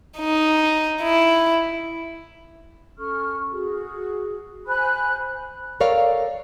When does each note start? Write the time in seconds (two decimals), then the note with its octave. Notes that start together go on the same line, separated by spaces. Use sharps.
0.19 D#4
1.02 E4
2.98 C#4 A4 C#6 F6
3.51 F#4 G#4
4.67 C5 G#5 B5 F#6
5.80 A4 A#4 C#5 D5 F5